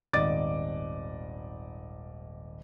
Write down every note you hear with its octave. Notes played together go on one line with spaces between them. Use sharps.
D#1 G#1 D5 D#5 D6 A6